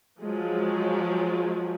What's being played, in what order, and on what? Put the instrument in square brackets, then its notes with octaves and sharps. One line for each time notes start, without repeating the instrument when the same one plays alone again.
[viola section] F3 F#3 G#3